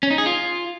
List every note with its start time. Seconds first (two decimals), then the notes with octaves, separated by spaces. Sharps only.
0.03 C#4
0.11 D#4
0.18 G#4
0.26 F4